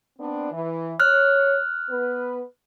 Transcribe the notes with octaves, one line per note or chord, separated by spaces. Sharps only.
B3 C4 D4
E3
C#5 F6 F#6
B3 B4